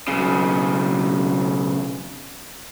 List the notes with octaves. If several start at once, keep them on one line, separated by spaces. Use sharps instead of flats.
B1 C#3